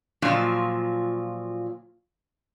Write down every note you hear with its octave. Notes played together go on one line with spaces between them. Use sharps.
A#2 F3 F#3 F4